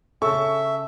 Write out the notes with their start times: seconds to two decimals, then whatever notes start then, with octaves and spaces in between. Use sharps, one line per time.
0.22 C#3 A4 E5 C#6